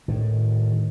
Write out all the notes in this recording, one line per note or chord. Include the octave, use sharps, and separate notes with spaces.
A2 D#3